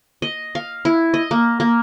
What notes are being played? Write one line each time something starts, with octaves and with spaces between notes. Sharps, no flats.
D#5
F5
E4
D#5
A#3
A#3